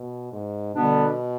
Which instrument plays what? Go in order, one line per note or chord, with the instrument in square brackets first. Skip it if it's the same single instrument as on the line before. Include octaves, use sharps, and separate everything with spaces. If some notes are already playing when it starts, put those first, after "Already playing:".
Already playing: [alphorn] B2
G#2
[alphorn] B2 [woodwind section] D3 G3 B3 D4